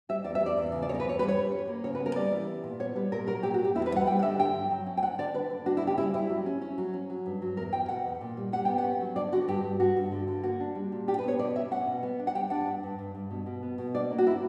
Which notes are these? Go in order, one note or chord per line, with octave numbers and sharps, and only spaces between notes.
G3 E5
E2 D5
E5
E2
D5
E2
C#3
D5
E2 C#5
A#4
B4
E2 C#5
G3 B4
C#5
G3
C#4
A#3
C#3 C#5
B4
B3
A#4
G3 D5
E3
B3
A#2
B3 C#5
G3 B4
A#2 A#4
F#3 A#4
A#2 G4
F#4
A#2 G4
E2 E4
B4
G3
F#5
G3 G5
F#5
D3 E5
G2 G5
F#3
F#3
C#4
G5
D3 F#5
D3 D5
D3 B4
D3
D4 F#4
E4
C#3 G4
G3 E4
G3 E4
F#3
C#4
C#4
F#3
C#4
F#3
G2
F#3
E2 A#4
E2 G5
B2 F#5
E2
A#2
G3
G3 F#5
B3 G5
F#5
C#4
F#3
D3 D5
D3 F#4
G2 G4
G2
G2 F#4
G2
D3
D3
A#3 F#4
D4
G3
A#2
D4 G4
B4
B3 C#5
B2 D5
B2 E5
C#4 F#5
B2
B3
D4
F#5
G3 G5
D4 F#5
G2
G2
G2
G2
B2
B2
B3
B2
D4 D5
A#3
F#4
D4 E4